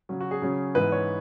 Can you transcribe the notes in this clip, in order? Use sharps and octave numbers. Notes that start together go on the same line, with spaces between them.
C#3 F#3 C#4
F#4
G#4
C#3 F#3 C#4
G#2 E3 B3 B4
C#5